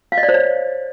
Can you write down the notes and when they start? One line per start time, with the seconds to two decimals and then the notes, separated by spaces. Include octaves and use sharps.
0.12 F5
0.18 D#5
0.23 D5
0.29 C5
0.34 C#5